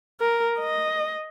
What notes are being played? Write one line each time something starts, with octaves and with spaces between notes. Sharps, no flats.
A#4
D#5